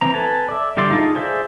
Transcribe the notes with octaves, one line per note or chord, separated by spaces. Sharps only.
E3 C4 A#5
A4 B4 G#5 A5
D5 E5
D3 G3 E4 D5 C6
D#4 F4 G#4 A4
G#4 C5 D5 E5